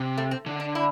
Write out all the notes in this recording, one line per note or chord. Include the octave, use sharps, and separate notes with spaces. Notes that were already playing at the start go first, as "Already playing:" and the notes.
Already playing: C3
A3
C4
D3
D4
E4